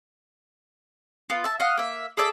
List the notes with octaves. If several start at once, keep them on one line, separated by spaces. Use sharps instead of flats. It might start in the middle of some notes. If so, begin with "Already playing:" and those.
B3 F4
E5 A5
D#5 F5 F#5
A#3 E5
G#4 A4 D5 E5